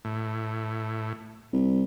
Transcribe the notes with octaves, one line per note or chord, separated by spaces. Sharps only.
A2
C2